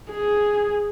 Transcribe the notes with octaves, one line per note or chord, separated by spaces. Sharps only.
G#4